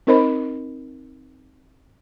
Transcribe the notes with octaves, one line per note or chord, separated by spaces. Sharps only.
C4 D#4 A#4 C5 D#5 B5